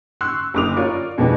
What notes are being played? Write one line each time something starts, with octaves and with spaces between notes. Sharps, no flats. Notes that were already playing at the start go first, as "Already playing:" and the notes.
C6 C#6 E6 F#6
F#1 D3 D6 D#6 F7
F4 A#4 C#5 D5 C#6
F2 B2 G#3 B3 D4 D#4